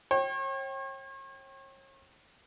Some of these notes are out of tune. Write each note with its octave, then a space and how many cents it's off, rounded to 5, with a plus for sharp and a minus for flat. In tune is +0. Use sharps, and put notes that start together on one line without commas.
C#5 -40 G5 -10